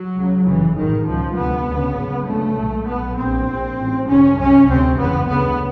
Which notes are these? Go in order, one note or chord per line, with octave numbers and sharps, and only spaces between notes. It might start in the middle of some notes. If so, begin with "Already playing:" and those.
Already playing: F#3
C#2 C#3
F1 F2 C#3 E3
A1 G#2 D#3
C#2 B2 F3
D2 C3 B3
D2 C#3
G#1 F#2 C#3
D2 C#3 A3
B1 A#2
B1 B2 B3
A#1 A#2 C4
A#1 A#2
A1 G#2
G#1 F#2 C#3 C#4
C2 C3 C#4
D2 C3 C4
F#1 E2 C#3 B3
D2 C#3 B3